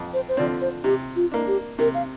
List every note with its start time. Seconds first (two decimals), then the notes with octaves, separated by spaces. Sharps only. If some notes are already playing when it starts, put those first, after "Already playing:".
Already playing: F2
0.14 C5
0.29 C5
0.37 D3 F3 C4 D5
0.61 C5
0.84 C3 G4
1.16 F4
1.32 A#3 D4
1.47 G4
1.79 C3 A#4
1.94 F5